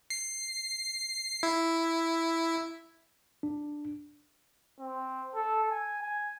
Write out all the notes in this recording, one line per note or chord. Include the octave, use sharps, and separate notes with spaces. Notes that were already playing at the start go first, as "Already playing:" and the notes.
C7
E4
D4
C4
A4
G#5
G#5